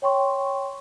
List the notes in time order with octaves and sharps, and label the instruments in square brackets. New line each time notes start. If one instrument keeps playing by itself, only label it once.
[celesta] C#5 G5 C6 C#6